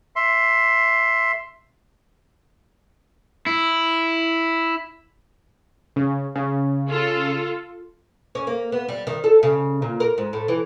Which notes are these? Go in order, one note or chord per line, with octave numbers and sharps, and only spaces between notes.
E5 C6
E4
C#3
C#3
F4 A4
C#4
A#3
B3
G3
D#3
A4
C#3
A#2
A#4
G#2
A2
E3